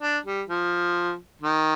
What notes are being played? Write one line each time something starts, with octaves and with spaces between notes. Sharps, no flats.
D4
G3
F3
D#3